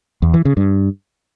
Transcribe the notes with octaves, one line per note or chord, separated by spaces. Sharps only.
E2
E3
C#3
G2